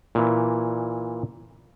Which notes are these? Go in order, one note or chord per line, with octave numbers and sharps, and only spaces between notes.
A#2 E3